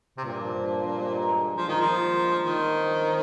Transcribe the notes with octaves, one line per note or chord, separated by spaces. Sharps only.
C3
G2 A#2
F3
G2
F3
G2
G#3
D#4
G#3
D#4
F3 D#4
A#2 D#3
F3 D#4
D#4
D3
D#4
D#3 D#4
C4
D#4
F3
C4